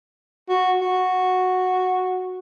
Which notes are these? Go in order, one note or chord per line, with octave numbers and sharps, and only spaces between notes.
F#4
F#4